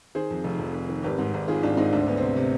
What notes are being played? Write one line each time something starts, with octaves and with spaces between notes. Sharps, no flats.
D#3 G#4 C5
F2
F1
F2
F1
D#3
G#1 G4 B4
G#2
G#1
D#3 F4 G#4
G#1 D4 F4
G#2 C4 D#4
D2 D4
C4
D2 B3
C3 C4
C3